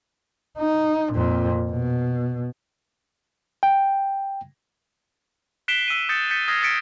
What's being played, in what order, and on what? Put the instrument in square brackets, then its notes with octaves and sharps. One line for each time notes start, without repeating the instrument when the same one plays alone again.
[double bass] D#4
F2 A#2
B2
[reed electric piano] G5
[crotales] F#6 B6 C7 D7 E7 G7
E6 B6 D#7
D#6 G6 A6 C#7
D#6 G6 A6 B6 C#7
D#6 F6 G#6 A#6 C7 D#7
D#6 A6 B6 C#7 D7